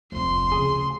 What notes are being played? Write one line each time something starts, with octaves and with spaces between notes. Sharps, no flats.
F1 D2 F3 A3 C4 C6
C#3 G#4